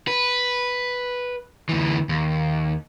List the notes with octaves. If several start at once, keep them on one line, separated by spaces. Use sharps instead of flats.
B4
D2 E3
D#2